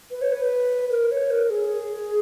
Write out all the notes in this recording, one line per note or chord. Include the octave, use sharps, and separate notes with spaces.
B4
C#5
B4
A#4
C#5
A#4
G#4